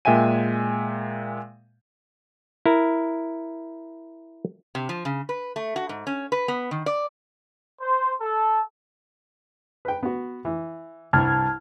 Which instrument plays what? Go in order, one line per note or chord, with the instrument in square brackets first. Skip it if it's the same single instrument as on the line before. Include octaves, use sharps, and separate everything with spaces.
[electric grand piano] A#2 G#3 E5 G5 G#5 D#7
[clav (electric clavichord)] E4 A#4
[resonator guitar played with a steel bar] C3
F3
C#3
B4
A3
F#4
G#2
C#4
B4
B3
D#3
D5
[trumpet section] C5
A4
[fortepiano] B4 G5
B3 F#4
E3
[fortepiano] C2 G2 [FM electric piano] A5 F6 G#6